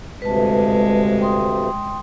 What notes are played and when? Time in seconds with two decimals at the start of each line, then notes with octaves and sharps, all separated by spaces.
0.22 D2 G2 C3 G#3 B4 A5
1.21 G5 C6 D#6